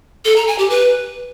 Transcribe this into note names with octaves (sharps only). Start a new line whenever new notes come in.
A4
A#5
G#5
G4
B4